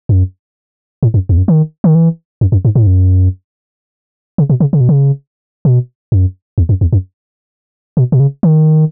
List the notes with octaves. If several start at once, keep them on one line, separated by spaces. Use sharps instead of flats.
F#2
A2
F#2
E2
F#2
D#3
D#3
E3
F#2
F#2
G#2
A2
G#2
F#2
C#3
B2
C#3
C#3
B2
C#3
B2
F#2
E2
F#2
E2
F#2
B2
B2
C#3
D#3